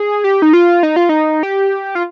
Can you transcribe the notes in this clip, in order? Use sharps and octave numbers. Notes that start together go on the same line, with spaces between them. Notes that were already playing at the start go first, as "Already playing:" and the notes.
Already playing: G#4
G4
D#4
F4
D#4
F4
D#4
G4
F4